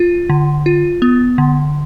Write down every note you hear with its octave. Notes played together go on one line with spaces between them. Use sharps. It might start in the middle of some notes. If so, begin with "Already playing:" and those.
Already playing: F4
D3
F4
B3
D3